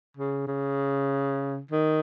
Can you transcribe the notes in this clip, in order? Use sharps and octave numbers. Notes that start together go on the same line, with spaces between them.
C#3
C#3
D#3